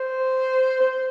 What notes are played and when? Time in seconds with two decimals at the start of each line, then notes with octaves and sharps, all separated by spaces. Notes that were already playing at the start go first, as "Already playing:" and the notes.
Already playing: C5
0.80 C5